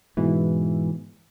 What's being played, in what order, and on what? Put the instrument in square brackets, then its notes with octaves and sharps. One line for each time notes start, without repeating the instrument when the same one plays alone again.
[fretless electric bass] G#2 B2 [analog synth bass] E3